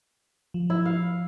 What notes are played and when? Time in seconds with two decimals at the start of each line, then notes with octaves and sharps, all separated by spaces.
0.54 F3
0.70 E4
0.86 F5